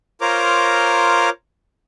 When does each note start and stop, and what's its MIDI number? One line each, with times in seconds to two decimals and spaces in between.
0.21 1.29 65
0.21 1.29 70
0.21 1.29 72
0.21 1.29 73
0.21 1.29 82
0.21 1.29 86